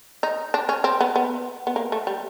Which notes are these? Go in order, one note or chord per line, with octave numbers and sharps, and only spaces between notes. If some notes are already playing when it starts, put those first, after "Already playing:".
D#4
D4
C#4
C4
B3
B3
B3
A#3
A3
G3